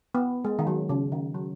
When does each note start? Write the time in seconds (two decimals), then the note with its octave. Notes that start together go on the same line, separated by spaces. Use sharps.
0.15 B3
0.45 G#3
0.59 D#3
0.67 F#3
0.89 C#3
1.12 D#3
1.34 F#3